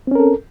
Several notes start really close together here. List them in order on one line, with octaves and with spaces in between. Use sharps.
C4 C#4 A#4 A4